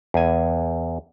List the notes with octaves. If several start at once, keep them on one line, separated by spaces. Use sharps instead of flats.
E2 G#5